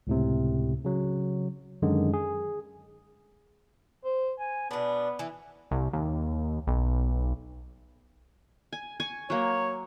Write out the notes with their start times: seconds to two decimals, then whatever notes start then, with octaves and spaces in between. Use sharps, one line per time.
0.07 C#2 A2 C3
0.85 C#3 F#3
1.82 F#2 D3 D#3 G#3
2.14 G#4
4.04 C5
4.39 G#5
4.71 B2 B3 D4
5.19 E3
5.71 C2
5.93 D#2
6.67 B1
8.73 G#5
9.00 G#5 C#6
9.30 F#3 A#3 C#5